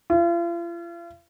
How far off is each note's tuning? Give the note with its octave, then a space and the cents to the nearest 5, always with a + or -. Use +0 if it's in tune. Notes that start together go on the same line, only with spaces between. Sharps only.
F4 -40